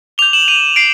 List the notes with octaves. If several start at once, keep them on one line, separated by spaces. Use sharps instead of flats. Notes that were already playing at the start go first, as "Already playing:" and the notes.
D6 G6 F7 G7
E7 F#7
D#7 F7
C7 D7